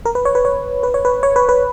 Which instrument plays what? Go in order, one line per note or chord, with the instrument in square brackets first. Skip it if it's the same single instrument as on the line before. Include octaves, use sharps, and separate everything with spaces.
[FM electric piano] A#4
B4
C#5
B4
C#5
B4
C#5
B4
C#5
B4
B4